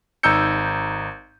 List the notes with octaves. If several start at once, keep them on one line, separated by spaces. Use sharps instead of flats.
G#1 D#4 A#5 E6 G6 C#7